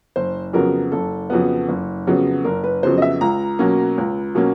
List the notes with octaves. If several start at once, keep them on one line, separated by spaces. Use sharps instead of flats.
F#1 C5
F2 C#3 F#3 B3 A#4
F#1 A4
F2 C#3 F#3 B3
F#1
F2 C#3 F#3 B3
F#1 A#4
B4
F2 C#3 F#3 B3 C5
D#5
E5
C#2 A#5
B2 F#3 A#3 C#4
C#2
B2 F#3 A#3 C#4